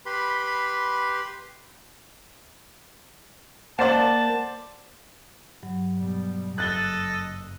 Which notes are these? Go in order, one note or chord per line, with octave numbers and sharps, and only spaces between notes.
G4 B4 B5 C6
A#3 C5 D5 F#5 A5
G2 F#3
B2 G3
F#1 A4 D#5 F#6 A6 G7